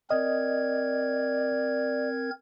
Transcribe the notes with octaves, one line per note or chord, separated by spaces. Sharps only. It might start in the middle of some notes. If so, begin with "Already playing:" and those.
C4 A#4 D5 D#5 G#6